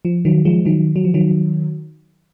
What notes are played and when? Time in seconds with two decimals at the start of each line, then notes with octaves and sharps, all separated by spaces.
0.05 F3
0.25 D#3 F#3
0.45 F3 G#3
0.65 D#3 F#3
0.96 F#3
1.05 F3
1.14 D#3 F#3